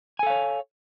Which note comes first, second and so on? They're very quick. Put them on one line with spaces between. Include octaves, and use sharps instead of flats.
G#5 A4 F5 C#5